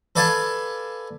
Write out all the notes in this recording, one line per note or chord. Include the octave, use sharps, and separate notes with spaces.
A4 B4 D5 F5 G#5 A5